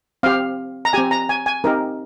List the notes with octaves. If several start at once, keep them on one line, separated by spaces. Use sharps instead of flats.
C4 G4 F5
A#5
C4 G4 G#5
A#5
G#5
G#5
C4 D#4 G4 A#4